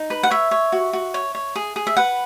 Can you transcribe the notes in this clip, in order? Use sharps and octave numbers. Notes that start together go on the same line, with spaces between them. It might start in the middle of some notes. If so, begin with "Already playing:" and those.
Already playing: D#4
B4
F#5
C#5 E5
C#5
F#4
F#4
C#5
C#5
G#4
G#4
E5
B4 F#5